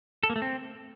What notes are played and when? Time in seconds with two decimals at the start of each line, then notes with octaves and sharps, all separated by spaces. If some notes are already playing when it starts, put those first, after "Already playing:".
0.23 A4
0.30 A#3
0.36 A3
0.42 C4